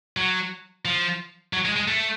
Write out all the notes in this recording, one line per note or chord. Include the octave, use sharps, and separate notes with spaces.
F#3
F3
F#3
G#3
G#3
A3